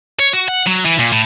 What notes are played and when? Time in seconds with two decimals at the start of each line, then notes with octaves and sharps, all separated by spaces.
0.19 C#5
0.33 F#4
0.48 F#5
0.67 F#3
0.85 E3
0.99 A#2
1.12 A2